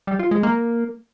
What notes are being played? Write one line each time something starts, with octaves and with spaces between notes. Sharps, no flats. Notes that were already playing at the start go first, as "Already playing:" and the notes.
G3
F4
G#3
A#3